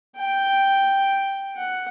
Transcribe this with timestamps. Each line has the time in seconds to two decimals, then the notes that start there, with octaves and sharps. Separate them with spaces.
0.17 G5
1.57 F#5